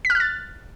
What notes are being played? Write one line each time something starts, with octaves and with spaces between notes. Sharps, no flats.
B6
F6
F#6
A6